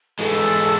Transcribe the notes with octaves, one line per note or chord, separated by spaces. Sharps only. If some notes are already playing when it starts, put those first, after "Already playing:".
G#2 E3 G#3 A4